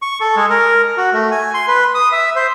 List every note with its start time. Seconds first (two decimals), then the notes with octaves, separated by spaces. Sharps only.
0.02 C#6
0.21 A4
0.36 G#3
0.50 A#4
0.97 F#4
1.13 A3
1.31 G#5
1.54 C6
1.68 B4
1.94 D#6
2.12 E5
2.36 C5